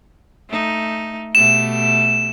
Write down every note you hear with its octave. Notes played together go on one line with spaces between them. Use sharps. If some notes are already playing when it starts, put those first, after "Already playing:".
A3 D#4
B2 A3 G4 E7